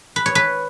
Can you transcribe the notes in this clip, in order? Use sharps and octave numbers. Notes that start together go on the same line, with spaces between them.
B4
C#5
B4